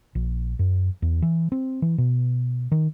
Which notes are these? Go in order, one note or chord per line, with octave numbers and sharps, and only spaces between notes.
A#1
F#2
E2
E3
C4
E3
B2
D#3